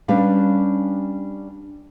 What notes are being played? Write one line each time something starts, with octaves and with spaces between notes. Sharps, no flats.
G3 C#4 D4 G4 B4 F5